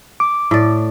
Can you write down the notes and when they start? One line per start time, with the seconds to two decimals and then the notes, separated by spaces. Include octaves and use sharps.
0.20 D6
0.51 A2 D5